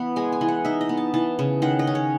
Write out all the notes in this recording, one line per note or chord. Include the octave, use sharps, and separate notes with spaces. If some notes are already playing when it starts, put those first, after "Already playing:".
Already playing: E3 B3
G#3 G#5
G#5
E3
F#5
D#4 E5
D#5
B3
A5
E3 A5
C#3
D#3 F#5
D#5
C#4
C#5